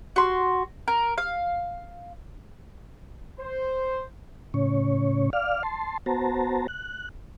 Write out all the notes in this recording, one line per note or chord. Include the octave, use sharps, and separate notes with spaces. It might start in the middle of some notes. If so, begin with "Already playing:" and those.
F#4 C6
A#4
F5
C5
A2 C#3 C#4 C#5
D5 F5 F6
A5 C6
B3 F#4 C5 A5 A#5
F#6